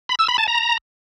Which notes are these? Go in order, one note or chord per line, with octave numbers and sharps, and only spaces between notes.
B5
E6
B5
A5
A#5